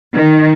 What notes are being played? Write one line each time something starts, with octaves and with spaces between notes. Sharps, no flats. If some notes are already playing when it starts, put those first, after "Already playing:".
D#3